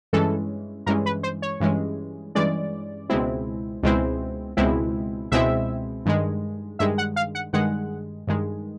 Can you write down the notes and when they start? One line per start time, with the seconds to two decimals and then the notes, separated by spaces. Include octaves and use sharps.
0.13 G2 E3 G#3 C#4 A4
0.86 G2 E3 G#3 C#4 A#4
1.06 B4
1.23 C5
1.42 C#5
1.60 G2 E3 G#3 C#4
2.35 G2 E3 G#3 C#4 D5
3.10 C#2 B2 G#3 C4 E4
3.83 C#2 B2 G#3 C4 E4
4.57 C#2 B2 G#3 C4 E4
5.31 C#2 B2 G#3 C4 E4 E5
6.06 G2 D#3 G#3
6.79 G2 D#3 G#3 E5
6.98 F#5
7.16 F5
7.35 F#5
7.53 G2 D#3 G#3 F#5
8.27 G2 D#3 G#3